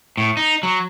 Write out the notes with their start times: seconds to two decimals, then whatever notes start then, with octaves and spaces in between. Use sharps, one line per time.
0.17 A2
0.37 D#4
0.63 F#3